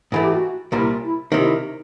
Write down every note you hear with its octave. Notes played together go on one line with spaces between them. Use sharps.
G#2 E3 A3 G#4
G4
F#4
C2 A#2 G3 E4
E4
C#2 C3 D#3 E4